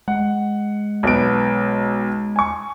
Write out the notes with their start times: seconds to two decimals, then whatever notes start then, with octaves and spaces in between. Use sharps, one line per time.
0.08 G#3 F#5
1.03 B1 B3 D7
2.36 G#5 C#6